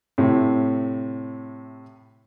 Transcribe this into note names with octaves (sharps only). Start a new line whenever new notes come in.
A2 C3